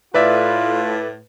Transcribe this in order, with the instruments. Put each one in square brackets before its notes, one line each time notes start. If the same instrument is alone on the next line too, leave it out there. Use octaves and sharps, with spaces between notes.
[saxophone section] A2 [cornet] F4 [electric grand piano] B4 D5 E5